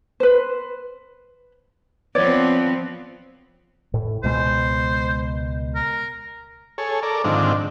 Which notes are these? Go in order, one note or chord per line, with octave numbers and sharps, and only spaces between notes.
B4 C5
F3 B3 C4 C#5 D5
A2
C#2 B2 G#3 C5
A#4
G#4 A4 C#5
A4 A#4 D5
G#2 D3 D#3 F3 C4 D4